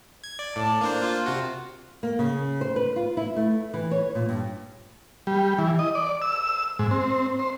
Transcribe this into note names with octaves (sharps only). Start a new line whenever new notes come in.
G#6
D5
A2 D5 A5
A#3 D4 C5
F4
C3 F#4
A#3
C#3
C5
B4
F4
E4
A3
E3
C#5
A#2
G2
G3
E3
D#5
D5
E6
G#2
C4
C5